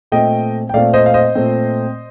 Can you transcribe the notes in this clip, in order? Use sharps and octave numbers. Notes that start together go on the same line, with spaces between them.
A#2 A3 C4 D#5 G5
G5
A#2 A3 C4 D5 F5
C5 D#5
F5
C5 D#5
A#2 A3 C4